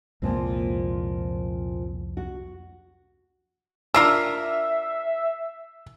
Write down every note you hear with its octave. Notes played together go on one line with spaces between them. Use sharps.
C2 F2 A#2 F3 G#3 C4
F#4
D4 F4 A#4 E5 E6 C7